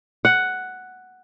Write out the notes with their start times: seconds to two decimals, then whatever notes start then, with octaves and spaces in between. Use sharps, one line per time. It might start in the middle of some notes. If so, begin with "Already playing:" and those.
0.25 F#5